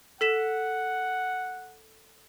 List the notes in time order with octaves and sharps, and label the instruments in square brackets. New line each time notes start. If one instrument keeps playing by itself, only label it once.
[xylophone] A4 B6 E7 [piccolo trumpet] F#5